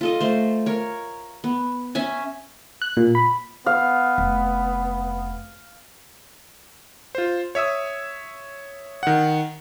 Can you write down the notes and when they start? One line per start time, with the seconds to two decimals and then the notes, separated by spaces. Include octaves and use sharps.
0.01 F4 A4 D#5
0.20 A3 C5
0.66 A#4 C#5
1.44 B3
1.95 C#4 E5 G#5
2.82 F#6
2.97 A#2
3.15 B5
3.66 B3 F5
4.18 F1
7.15 F4 C5
7.55 C#5 E5 D#6 E6
9.03 D#3 F#5